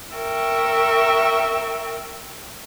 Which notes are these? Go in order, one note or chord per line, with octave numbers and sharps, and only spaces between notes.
A#4 E5 G5 C#6